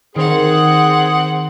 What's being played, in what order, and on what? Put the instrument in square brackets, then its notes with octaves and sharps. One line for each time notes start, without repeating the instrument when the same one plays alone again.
[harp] D#3 [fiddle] C4 F#5 [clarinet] G#4